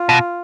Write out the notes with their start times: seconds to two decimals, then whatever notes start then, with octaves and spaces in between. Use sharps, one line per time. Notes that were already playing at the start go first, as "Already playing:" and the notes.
Already playing: F4
0.09 B2